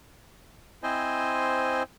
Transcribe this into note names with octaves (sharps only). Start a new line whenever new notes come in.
C4 E4 C5 D#5 G#5